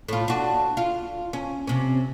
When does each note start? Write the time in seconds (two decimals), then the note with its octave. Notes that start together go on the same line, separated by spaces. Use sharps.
0.09 A2 F4
0.28 D4 F#4
0.77 F4
1.33 C#4
1.67 C3 C#4